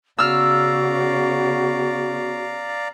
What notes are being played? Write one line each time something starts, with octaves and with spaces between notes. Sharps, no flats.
C#3 B3 F#4 D5 F5 A#5 E6 F6